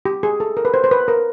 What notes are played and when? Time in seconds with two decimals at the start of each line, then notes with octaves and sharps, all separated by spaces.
0.05 G4
0.23 G#4
0.40 A4
0.57 A#4
0.65 B4
0.74 C5
0.84 C5
0.91 B4
1.08 A#4